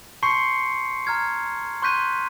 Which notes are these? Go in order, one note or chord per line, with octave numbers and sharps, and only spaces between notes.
A5 C6 C#6 G6 C7 C#7
A#5 F6 G#6
C6 C#6 F#6 G6 B6 D#7